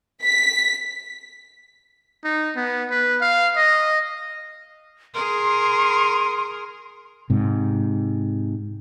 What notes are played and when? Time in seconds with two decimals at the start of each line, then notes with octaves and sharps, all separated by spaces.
0.23 B6
2.24 D#4
2.56 B3
2.90 B4
3.21 F5
3.57 D#5
5.15 G#4 A#4 C6
7.30 G#2 C3